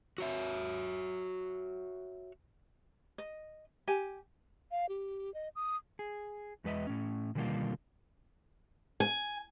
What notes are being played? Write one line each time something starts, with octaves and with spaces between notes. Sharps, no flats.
F#4 C#5 E5
D#5
G4 G#5
F5
G4
D#5
D#6
G#4
E2 G#3 B4 D#5 E5
A2 C#4
B2 D3 D#3 G3 A#3 F4
G#5